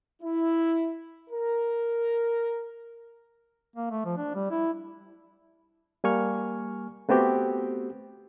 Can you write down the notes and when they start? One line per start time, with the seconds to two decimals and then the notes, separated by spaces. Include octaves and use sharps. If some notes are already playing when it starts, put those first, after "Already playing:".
0.22 E4
1.30 A#4
3.76 A#3
3.90 A3
4.05 F3
4.17 D4
4.35 G3
4.51 E4
6.04 G3 A#3 G#5 C#6 F6
7.09 A3 B3 C4 F#4 G4